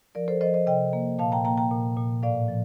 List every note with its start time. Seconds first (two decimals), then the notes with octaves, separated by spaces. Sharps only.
0.15 F3 A#4 D5
0.28 A4 C5
0.41 F3 C5 D#5
0.54 C5 D#5
0.67 C3 D#5 G5
0.93 A#3
1.19 A#2 F5 A5
1.32 G5 A#5
1.45 A#3 G5 A#5
1.57 G5 A#5
1.71 A#2
1.97 A#2
2.23 A2 D5 F5
2.49 F3